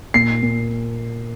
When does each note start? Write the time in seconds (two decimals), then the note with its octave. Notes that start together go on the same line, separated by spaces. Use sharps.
0.14 A#2 C7
0.43 A#2